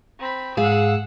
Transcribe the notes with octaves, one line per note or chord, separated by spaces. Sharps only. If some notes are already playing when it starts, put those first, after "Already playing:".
C4 B5
G#2 G#4 F5 F#5 E6